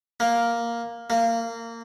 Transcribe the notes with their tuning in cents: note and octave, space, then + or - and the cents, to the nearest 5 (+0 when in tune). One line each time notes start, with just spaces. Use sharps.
A#3 +5
A#3 -20